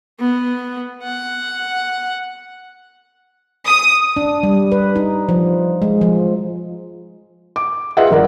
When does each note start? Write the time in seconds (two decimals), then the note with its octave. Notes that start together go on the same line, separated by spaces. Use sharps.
0.20 B3
1.03 F#5
3.68 D#6
4.17 D4
4.43 G3
4.72 B4
4.96 D#4
5.29 F3
5.82 G#3
6.01 F3
7.56 D6
7.97 F4 G#4 B4 D#5 E5 F#5
8.11 G1 A#4 D5